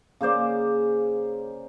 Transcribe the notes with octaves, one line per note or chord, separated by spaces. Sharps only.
C#3 A#3 C5 D5